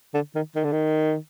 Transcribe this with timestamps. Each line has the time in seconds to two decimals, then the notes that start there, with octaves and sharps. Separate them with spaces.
0.14 D3
0.35 D#3
0.55 D#3
0.64 D3
0.72 D#3